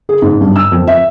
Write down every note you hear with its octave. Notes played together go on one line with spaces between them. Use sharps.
G#4
G#2
G2
E6
F2
E5